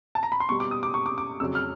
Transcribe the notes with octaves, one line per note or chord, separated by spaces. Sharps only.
A5
A#5
B5
C6
B2 G3 C#6
D6
D#6
D6
C#6
D6
D6
F2 C#3 F#3 E6
F6